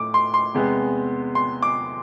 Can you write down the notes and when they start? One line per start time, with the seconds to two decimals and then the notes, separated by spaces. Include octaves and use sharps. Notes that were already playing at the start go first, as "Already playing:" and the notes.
Already playing: A2 D6
0.14 C6
0.34 C6
0.54 E2 C3 G#3 B3
1.35 C6
1.63 D6